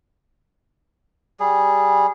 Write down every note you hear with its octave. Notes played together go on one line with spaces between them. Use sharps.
G3 G#4